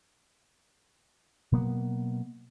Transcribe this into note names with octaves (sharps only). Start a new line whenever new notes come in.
B2 F#3 A#3 B3